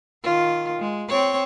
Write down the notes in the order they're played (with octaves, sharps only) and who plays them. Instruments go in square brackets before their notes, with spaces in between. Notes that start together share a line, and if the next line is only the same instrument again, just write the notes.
[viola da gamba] D#3 F4
G#3
C4 C#5